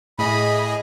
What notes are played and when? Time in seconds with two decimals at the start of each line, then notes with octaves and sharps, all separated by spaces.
0.19 A2 G#4 D#5 B5